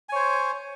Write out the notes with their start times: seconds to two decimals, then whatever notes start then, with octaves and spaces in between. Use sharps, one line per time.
0.09 G#5
0.12 C#5
0.15 C5